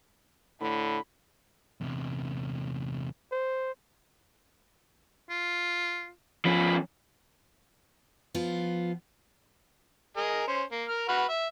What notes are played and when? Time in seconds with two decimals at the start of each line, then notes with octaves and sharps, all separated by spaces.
0.61 A2 D3 B5
1.81 E2 C3
3.32 C5
5.29 F4
6.45 F3 C#4 B5
8.34 F3 B3 F4
10.17 G#4 A#4 D#5
10.47 C#4 C5
10.72 A#3
10.89 A#4 F6
11.08 F#4 B4 F6
11.29 E5